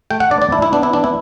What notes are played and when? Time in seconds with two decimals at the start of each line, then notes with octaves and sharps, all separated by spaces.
0.10 A3 G5
0.20 F#5
0.31 D4 D5
0.42 D5
0.52 D4 E4
0.62 E4
0.73 B3 D4
0.83 E4
0.93 E3 D4
1.04 E4